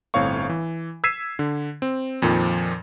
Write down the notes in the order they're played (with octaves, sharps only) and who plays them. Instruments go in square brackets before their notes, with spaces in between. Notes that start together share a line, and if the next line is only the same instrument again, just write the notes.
[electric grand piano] G1 A2 C4 C#5 F5 C#6
E3
E6 G#6 B6 C7 D#7 E7
D3
C4
F2 A#2 D#3 F3